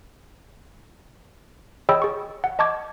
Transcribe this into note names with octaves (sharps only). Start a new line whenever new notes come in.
G#4 C#5 D#5 G5 B5 E6
G#4 C#6
F#5
D#5 A5 C#6 D6 G#6